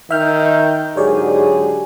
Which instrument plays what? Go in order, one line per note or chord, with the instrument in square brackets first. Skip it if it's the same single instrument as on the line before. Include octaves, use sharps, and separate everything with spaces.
[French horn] D#3 [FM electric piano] E5 F6 [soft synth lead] G6
[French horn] G#2 [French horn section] D3 F#3 G#4 [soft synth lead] G4 [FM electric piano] C#5 D5